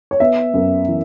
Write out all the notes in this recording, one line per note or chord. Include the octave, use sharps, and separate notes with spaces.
C#5
B3 E5
F#2
E3